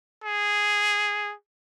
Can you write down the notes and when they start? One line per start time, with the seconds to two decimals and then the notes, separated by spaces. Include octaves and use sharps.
0.24 G#4